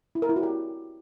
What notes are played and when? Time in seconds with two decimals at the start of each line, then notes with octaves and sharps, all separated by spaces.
0.15 E4
0.22 A#4
0.29 E4
0.36 F#4
0.43 G4